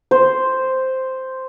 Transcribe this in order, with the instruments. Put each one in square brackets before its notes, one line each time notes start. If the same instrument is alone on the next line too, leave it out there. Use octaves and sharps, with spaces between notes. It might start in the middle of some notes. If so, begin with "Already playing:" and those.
[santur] C5